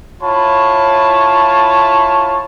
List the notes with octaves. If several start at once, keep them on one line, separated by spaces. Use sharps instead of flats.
E4 F4 C#5 A5 B5